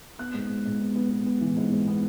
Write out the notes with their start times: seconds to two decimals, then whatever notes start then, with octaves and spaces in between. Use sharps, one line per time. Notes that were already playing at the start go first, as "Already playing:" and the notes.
0.19 B3 F#6
0.34 G#2
0.49 G#2
0.65 G#2
0.79 B3
0.96 B3
1.10 B3
1.26 B3
1.41 E3
1.57 G#2
1.72 G#2
1.87 B3